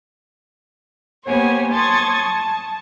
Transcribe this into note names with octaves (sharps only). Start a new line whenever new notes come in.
A#3 B3 G4 C5 C#5 G#5
A5 C6 C#6 D#6 G#6 A6
A5